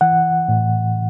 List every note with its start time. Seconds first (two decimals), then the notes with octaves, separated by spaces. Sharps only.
0.01 E3 F#5
0.48 A2